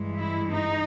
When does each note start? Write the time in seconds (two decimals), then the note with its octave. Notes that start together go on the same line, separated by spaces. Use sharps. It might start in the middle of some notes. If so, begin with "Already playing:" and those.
Already playing: G2 E3 G#3
0.16 E4
0.50 D#4